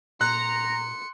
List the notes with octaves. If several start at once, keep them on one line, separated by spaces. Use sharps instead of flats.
A#2 A#5 C6 F#6 C#7